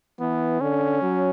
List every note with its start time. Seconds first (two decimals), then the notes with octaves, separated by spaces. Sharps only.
0.20 E3 B3
0.61 D3 C#4
1.02 F#3